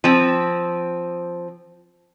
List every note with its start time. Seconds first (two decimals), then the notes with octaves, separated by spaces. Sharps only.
0.04 F3 C4